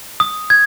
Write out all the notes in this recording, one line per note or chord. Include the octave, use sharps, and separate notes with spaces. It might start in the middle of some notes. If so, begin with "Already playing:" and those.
D#6
G#6